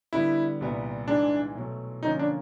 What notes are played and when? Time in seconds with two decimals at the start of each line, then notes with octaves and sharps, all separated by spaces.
0.13 D3 G3 B3 E4
0.61 C2 A#2 G3 B3
1.08 G#2 E3 G#3 D4
1.55 B2 F#3 A3
2.03 D3 F3 A#3 C#4 D#4
2.19 D4